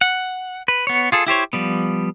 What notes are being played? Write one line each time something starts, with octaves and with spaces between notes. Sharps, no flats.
F#5
B4
B3 C#5
F4 G#4 A4
E4 G4 C5 C#5
F3 G3 B3